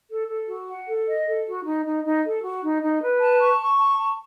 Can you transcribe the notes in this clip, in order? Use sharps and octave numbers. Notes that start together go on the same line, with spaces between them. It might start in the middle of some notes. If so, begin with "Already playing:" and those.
A4
A4
F#4
F#5
A4
D#5
A4
F#4
D#4
D#4
D#4
A4
F#4
D#4
D#4
B4
A5
C#6
C#6
A5
A5